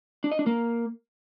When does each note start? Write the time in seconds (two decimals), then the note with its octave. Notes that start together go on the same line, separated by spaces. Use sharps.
0.24 D4
0.32 D#5
0.39 D4
0.46 A#3